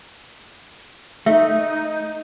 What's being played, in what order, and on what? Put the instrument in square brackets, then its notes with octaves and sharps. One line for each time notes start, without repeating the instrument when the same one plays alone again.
[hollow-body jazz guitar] A3 [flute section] D#4 [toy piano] E5